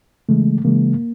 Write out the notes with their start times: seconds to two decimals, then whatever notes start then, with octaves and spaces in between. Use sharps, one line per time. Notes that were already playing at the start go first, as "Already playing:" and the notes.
0.29 C#3 E3 G#3 A3
0.64 C#3 E3 G#3 A#3